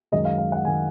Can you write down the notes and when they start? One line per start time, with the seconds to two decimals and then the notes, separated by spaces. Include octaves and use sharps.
0.12 F#2 D#3 G#3 D#5
0.25 F5
0.38 F5
0.52 F#5
0.65 D#3 G#3 G#5